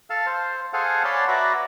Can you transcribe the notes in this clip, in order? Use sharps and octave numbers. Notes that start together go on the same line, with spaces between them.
A4 F5 A5
C5
G#4 A4 C5 F5 F#5 G#5
C#5 D5 F#5 A5 B5 C6
F#4 B4 D5 E5 A#5 B5